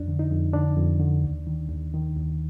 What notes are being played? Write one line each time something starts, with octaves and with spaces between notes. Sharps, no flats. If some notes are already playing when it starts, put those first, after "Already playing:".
Already playing: F2 D4
D3
D#4
F2
D3 D4
F2
D3
D#2
D#3
D#2
D#3
D#2